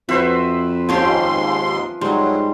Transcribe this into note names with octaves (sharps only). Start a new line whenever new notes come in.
F2 F#4 B4 C5 E5
D#2 G#2 F3 C4 C#4 G4 C6
G#2 F#3 G3 C6